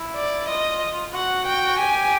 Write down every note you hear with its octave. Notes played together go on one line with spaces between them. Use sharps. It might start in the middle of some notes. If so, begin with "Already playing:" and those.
Already playing: E4
D5
F4 D#5
F#4 F#5
G5
G4 G#5